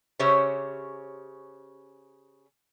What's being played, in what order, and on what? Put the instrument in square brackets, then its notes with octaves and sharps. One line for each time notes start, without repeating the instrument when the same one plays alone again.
[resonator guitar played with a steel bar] C#3 C#4 G4 C5 C#5 E5